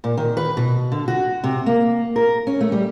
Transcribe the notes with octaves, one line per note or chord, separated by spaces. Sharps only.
A#2
D#3
B4
B2
D3
F#4
C3
A#3
A#4
C#4
A3
G3